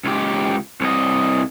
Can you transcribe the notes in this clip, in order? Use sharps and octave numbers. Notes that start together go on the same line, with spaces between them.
C#2 G4
C2 D#5